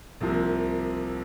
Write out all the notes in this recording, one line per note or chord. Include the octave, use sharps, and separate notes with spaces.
C2 C3 F3 A#3